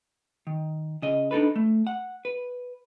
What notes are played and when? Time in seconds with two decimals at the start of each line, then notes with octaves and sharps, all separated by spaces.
0.47 D#3
1.02 C#3 D#5
1.31 D4 D#4 A4 B4
1.56 A3
1.87 F#5
2.25 B4